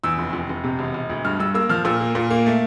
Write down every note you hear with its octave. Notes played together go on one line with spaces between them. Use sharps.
E2 E6
F1
F1
F1
C3
E1
E1
D2
G2 F6
G2 E6
A#3 E6
F3 F6
A#2 E6
A#3
A#2
A#3
A3